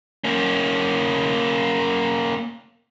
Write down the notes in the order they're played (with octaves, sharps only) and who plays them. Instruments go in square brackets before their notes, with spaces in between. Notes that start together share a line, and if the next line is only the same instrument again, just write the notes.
[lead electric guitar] A#3 C#4